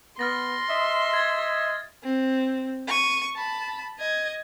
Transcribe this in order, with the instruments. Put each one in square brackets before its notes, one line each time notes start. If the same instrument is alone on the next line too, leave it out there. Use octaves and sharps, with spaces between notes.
[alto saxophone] B3 [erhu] C6 [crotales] F6 A6 A#6
[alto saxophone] D#5 [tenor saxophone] E5
[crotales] G#6 A6
[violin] C4
C#6 D#7
A5 B5
D#5 G#6